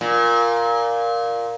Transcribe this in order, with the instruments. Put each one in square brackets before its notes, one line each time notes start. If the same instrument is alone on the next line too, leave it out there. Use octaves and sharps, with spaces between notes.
[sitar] A#2